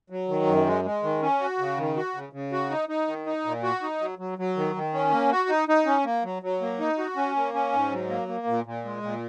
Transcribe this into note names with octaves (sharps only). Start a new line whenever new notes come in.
F#3
D#3
F#2
G#3
G#3
D#3
C#4
F#4
C#3
D#3
F#4
C#3
C#3
F#4
D#4
D#4
D#3
D#4
A#2
F#4
D#4
F#3
F#3
F#3
D#3
D#3
C#4
A#3
F#4
D#4
D#4
C#4
A#3
F#3
F#3
A#3
D#4
F#4
C#4
A#3
C#4
G#2
F#3
A#3
A#3
A#2
A#2
G#3
A#2